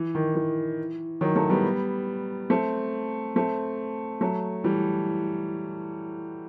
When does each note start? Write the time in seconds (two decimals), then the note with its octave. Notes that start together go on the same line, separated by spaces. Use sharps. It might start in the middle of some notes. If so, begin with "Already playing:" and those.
Already playing: E3
0.15 D#3
0.35 E3
1.21 D#3 F#3
1.35 F#3 A3
1.49 G3 B3
2.50 A3 C4
3.36 A3 C4
4.21 F#3 A3
4.64 E3 G3